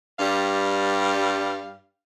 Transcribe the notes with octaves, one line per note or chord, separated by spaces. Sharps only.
G2 G3 F5